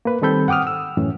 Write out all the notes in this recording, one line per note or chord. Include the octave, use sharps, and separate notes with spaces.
A#3 B4
D#3 G3 C4 A4 B5 G6
F#5 G5 D6 D#6 F6
E6
F#2 A2 E3 C#4